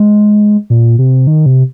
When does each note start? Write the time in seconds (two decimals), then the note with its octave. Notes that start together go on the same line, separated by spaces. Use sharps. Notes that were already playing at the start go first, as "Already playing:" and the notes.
Already playing: G#3
0.70 A#2
0.99 C3
1.27 D#3
1.46 C3